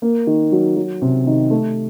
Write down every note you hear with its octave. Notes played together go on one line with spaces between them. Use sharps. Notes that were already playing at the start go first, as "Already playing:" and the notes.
A#3
D#3
F#3
F#3
C3
D#3
A3